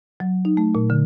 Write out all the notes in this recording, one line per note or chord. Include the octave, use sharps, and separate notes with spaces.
F#3
D#4
A3
A#2
D3